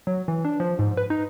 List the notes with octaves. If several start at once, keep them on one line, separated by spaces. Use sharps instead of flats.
F#3
E3
D4
F3
G#2
B4
D#4